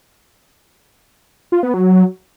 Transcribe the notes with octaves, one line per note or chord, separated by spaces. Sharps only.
F4
B3
F#3